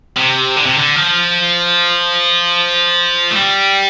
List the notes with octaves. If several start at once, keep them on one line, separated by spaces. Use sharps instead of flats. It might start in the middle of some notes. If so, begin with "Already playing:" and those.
C3
D3
C3
D3
F3
A3
G3